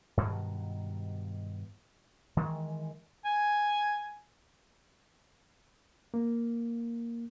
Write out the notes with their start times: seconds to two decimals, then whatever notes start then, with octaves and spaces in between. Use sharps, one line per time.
0.17 G2 B2 D#3 F#3
2.37 D#3 E3 G#3
3.25 G#5
6.14 A#3